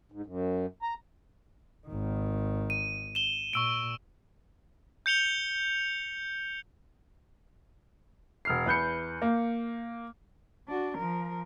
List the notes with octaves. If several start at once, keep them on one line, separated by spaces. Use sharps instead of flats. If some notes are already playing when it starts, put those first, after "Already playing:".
G#2
F#2
A#5
G#1 D#3
D#7
E7 G7
A#2 C#6 E6 D7
G6 C#7 F7 G7
E1 F6 C7
E2 B4 G6 C#7
A#3
D4 F#4
F3 A#4